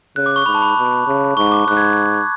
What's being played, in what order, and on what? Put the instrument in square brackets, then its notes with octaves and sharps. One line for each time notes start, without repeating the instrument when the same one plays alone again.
[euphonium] C#3 [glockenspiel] F#6
[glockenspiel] D6
C#6
[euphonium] G#2 [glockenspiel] B5
[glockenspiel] A5
B5
[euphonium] B2
C#3
[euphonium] G#2 [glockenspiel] C#6
[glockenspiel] D6
[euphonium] G#2 [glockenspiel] F#6
[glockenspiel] G#6